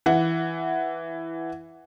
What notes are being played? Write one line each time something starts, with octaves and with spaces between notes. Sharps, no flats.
E3 F#5